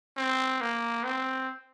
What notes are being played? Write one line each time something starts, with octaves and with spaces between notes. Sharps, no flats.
C4
A#3
C4